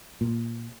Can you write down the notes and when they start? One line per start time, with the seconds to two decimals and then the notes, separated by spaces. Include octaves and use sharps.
0.21 A#2